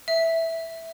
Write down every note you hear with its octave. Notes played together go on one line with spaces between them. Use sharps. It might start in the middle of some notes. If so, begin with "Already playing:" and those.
E5